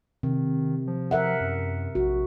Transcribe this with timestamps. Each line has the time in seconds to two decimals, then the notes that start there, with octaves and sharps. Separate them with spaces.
0.23 C3 D#3
0.87 F3
1.11 A#4 E5 F#5
1.41 F#2
1.95 A#1 F#4